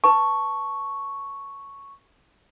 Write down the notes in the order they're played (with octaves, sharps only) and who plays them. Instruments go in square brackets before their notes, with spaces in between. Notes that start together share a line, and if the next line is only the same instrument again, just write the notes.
[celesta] B4 A5 [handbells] C#6